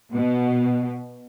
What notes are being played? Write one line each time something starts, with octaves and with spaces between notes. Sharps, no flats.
B2